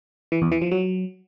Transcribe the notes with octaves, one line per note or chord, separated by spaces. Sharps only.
E3
E2
E3
F3
F#3